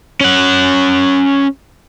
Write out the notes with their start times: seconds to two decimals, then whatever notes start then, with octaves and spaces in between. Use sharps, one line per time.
0.21 C#4 F#5